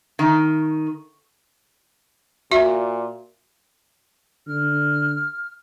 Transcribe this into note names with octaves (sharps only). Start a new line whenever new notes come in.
D#3
A#2 F#4 E5
D3 F6